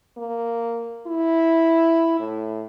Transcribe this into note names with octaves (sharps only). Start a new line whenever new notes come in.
A#3
E4
A2